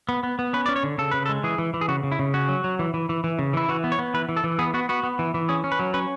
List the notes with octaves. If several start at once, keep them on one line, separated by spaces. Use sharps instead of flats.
B3
B3
B3
C#4 B4
C#4 D5
C#5
D3
C#3 A4
C#3 B4
A4
G#3
E3 G#4
E3
E3
G#4
C#3 F#4
C#3
E4
C#3
C#4 F#4
F#3
F#3
E3
E3
E3
E3
C#3
E3 E4
E3 F#4
B3
C#5
B3
E3 B4
E3
A4
E3
B3 G#4
B3 F#4
B3 F#4
B3
E3
E3
C#4 G#4
C#4
B4
F#3
C#4 B4